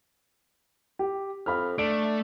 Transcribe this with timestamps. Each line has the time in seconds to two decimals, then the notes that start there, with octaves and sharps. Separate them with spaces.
0.99 G4
1.46 F2 F5 B5 F6
1.78 A3 D4 D7